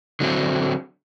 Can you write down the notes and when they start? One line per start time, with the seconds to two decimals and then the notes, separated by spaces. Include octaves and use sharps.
0.20 D3 F#3 C4 E4